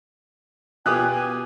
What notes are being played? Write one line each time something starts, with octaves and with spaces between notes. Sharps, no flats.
B2 F4 G4 G#5 D6 D#6 F#6
G#5